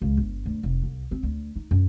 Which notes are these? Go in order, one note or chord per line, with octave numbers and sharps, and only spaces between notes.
C#2
G1
D2
F1
C2
C4
D2
D#4
F#2